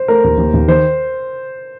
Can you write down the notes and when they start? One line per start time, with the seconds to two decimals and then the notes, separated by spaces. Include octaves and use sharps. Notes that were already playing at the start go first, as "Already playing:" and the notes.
Already playing: C5
0.08 A3 A#4
0.24 D#2
0.38 D#2
0.54 D#2
0.68 D#3 C5